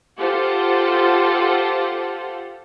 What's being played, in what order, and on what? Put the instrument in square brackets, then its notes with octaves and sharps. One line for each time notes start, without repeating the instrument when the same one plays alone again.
[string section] F4 G4 A4 C5 F#5